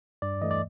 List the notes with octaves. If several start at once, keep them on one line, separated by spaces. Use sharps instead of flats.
G2 D5
E3 A3 D#5
D5